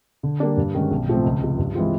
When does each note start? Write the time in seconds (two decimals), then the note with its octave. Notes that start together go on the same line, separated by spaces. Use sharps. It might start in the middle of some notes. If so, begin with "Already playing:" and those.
0.23 D3
0.40 G3 A#3 D4
0.57 G2
0.75 D#3 G#3 C#4
0.91 B1
1.08 A2 F3 A3 C4
1.24 C#2
1.42 C3 F3
1.58 G2
1.75 E3 G#3 C4 F4